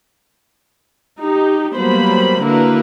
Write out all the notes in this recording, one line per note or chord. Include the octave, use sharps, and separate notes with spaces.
D#4 G4
F#3 G3 A#3 B3 C5 B5
D3 A#3 E4 F#4 A#4 B4